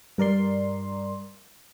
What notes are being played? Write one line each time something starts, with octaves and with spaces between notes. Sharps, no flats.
G2 A#4 D5 C6